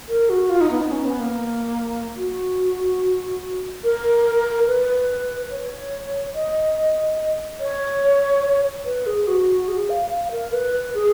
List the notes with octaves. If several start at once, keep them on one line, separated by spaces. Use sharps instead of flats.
A#4
F#4
F4
D#4
B3
D#4
C#4
B3
A#3
F#4
A#4
B4
C#5
D#5
C#5
B4
G#4
F#4
G#4
F5
F5
A#4
B4
G#4